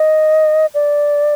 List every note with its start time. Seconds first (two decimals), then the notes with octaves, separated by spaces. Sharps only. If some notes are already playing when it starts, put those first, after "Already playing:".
Already playing: D#5
0.74 D5